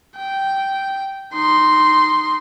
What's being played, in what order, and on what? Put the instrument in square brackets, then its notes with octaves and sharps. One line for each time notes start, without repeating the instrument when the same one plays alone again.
[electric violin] G5
D#4 C6